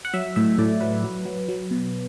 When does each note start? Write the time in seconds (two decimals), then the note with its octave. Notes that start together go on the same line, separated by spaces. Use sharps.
0.05 F#5
0.14 F#3 E5
0.36 A2 E5
0.58 A2 D5
0.80 F#3 B4
1.04 F#3
1.25 F#3
1.48 F#3
1.71 B2